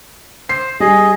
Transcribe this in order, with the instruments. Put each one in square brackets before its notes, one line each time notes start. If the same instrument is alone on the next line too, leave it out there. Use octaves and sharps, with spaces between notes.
[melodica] C5 [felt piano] C7
[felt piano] G3 [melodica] G#4 D#5